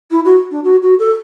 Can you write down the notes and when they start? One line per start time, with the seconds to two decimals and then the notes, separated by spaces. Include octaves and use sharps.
0.11 E4
0.25 F#4
0.51 D4
0.64 F#4
0.82 F#4
0.99 A4